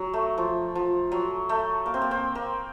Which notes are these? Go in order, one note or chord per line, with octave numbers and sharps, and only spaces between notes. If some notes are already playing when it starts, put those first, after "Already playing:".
Already playing: F#3
A3
F3
F3
F#3
A3
A#3
C4
A#3
C4
A#3